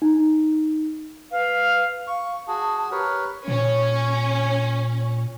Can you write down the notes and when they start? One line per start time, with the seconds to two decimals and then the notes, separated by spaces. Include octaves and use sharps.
0.02 D#4
1.31 B4 F5
2.07 F5 C#6
2.48 F#4 G#4 A5
2.91 G4 A#4 B4 C#5
3.48 A#2 C#4